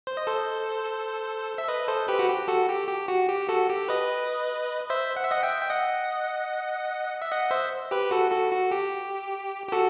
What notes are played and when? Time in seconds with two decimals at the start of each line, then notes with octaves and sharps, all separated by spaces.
0.07 C5
0.17 D#5
0.27 A4 C5
1.58 E5
1.68 B4 D#5
1.88 A4 C5
2.08 G4 B4
2.19 F#4
2.29 G4
2.48 F#4 A4
2.69 G4
2.88 G4
3.08 F#4
3.29 G4
3.49 F#4 A4
3.70 G4
3.89 B4 D#5
4.90 C5 E5
5.16 F#5
5.24 E5
5.31 D#5 F#5
5.43 E5 G5
5.62 G5
5.70 D#5 F#5
7.22 E5
7.32 D#5 F#5
7.51 C5 E5
7.91 G4 B4
8.11 F#4 A4
8.32 F#4 A4
8.52 F#4
8.71 G4
9.68 G4
9.72 F#4 A4